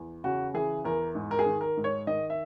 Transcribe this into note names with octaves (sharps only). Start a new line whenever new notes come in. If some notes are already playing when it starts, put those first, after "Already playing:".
Already playing: E2
C#3 F#4
E3 G#4
E2 A#4
G#2
A#4
G#4
D#3
A#4
G#2
C#5
D#3 D#5
E5